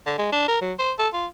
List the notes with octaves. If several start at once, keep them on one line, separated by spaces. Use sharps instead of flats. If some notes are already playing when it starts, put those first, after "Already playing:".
D3
G#3
D4
A#4
F#3
C5
A4
F4